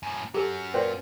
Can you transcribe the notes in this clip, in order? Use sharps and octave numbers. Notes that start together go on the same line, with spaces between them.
F#2 A2
F#3 C#4 G4 A4
A#2 B4 C5 G5